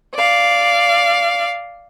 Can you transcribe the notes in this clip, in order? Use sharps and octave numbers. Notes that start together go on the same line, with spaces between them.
D5 F5